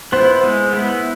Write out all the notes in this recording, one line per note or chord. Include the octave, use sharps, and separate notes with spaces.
B3 E4 C5
G#3
B3 E4